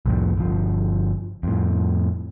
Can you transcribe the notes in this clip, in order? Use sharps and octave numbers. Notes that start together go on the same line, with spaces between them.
C2 F2 A2 F3
G1 F3
F2 A2